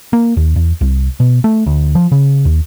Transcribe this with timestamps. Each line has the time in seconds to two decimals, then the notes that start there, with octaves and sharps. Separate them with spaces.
0.13 A#3
0.37 D#2
0.56 E2
0.81 C2
1.20 B2
1.44 A3
1.66 D2
1.95 F3
2.12 C#3
2.45 D#2